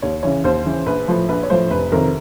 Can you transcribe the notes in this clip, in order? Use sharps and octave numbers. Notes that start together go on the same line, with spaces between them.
D#2 C#5
C#3 E3 C#5
D#2 C5
C#3 E3
A#1 B4
A2 F3
A#1 B4
C#5
A2 F3 C5
F1 B4
F2 C3 D#3 A#4